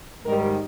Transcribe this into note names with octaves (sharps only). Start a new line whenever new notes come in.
G#2 D#3 G3 A#4